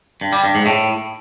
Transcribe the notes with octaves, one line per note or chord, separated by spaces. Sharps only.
G2
G3
G2
G#2
A2